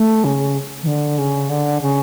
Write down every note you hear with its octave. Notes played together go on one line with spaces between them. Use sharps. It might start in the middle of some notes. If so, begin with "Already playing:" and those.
Already playing: A3
C#3
E3
D3
C#3
D3
C#3